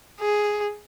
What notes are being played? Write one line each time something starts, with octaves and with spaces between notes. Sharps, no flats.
G#4